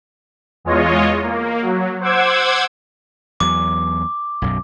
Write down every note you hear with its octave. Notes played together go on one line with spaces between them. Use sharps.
E2 G#3 F4 C#5 D#5
A#3
F#3
C5 F#5 D6 E6 G#6
E2 F#3 D6
B1 F#2 B2